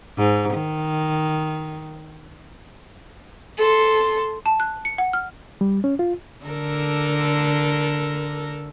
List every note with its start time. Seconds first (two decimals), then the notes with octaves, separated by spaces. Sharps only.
0.18 G#2
0.53 D#3
3.58 A4 C6
4.46 A5
4.60 F#6
4.85 C#7
4.98 F#5
5.13 F6
5.61 G3
5.84 C#4
5.99 F4
6.46 D3 A4 A#4